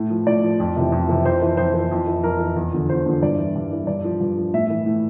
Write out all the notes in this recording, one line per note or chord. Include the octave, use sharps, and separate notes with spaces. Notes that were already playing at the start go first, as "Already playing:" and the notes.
Already playing: A2
F3
A2 D5
F3
F2
C3 E3
F2
C3 E3
F2 C5
E3
F2 C5
E3
F2
E3
F2 A#4
E3
E2
D3 F3
E2 C5
D3 F3
G2 D5
E3
G2
E3
G2 D5
F3
G2
F3
A2 E5
E3
A2